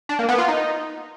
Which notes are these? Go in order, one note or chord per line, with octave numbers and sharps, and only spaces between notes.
D4
A#3
B3
F4
D#4